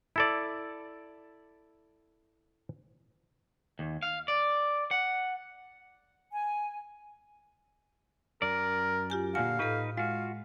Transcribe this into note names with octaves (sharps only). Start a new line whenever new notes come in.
E4 A4 D5
D#2
F5
D5
F#5
G#5
F#2 A#4 D5
F4 G4 G#5
A#2 D3 F#4 F5 G#5
A2 D#4 A4 B4
G#3 F4 F#4 F5